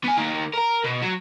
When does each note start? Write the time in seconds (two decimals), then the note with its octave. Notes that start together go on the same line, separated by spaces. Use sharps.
0.04 B3 G#5
0.17 D#3 A#3
0.53 A#4 A#5
0.84 B2
1.02 F#3